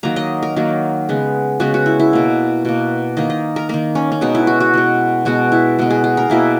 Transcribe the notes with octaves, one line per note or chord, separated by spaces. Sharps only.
D#3 F#3 A#3 A#5
D#5
A#4
D#3 F#3 A#3
C#3 G#3 B3
C#3 G#3 B3 F#4
F#4
E4
E4
B2 A#3
B2 A#3
D#3 A#3 D#5
D#5
A#4
D#3 A#3 A#4
C#4
C#4
B2 G#3 B3 D#4
E4
F#4
F#4
B2 G#3 B3
B2 G#3 B3 F#4
E4
B2 G#3 B3
G#4
G#4
A#4
B2 A#3 E4